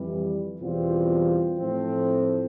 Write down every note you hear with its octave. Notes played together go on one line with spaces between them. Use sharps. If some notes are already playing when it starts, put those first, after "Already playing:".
Already playing: F2 E3 G3
E2 B2 G3 C4 F4
A2 F3 A3 C4